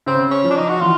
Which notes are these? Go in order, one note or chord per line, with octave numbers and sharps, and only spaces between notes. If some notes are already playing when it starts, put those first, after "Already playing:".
C#3 C4
C#4
F3
D4
D#4
F#4
E3 F4